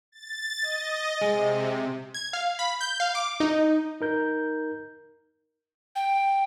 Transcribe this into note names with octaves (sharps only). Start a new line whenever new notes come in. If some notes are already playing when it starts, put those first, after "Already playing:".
A6
D#5
C3 G#3
G#6
F5
B5
G6
F5
D6
D#4
D#4 A#4 G6
G5